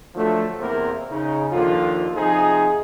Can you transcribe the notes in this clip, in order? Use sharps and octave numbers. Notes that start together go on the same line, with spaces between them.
D3 F3 F#3 A3
E2 C3 A#3 E4 A#4 C5
C#3 D#4
D#2 D3 F3 F4
C3 F3 D#4 G#4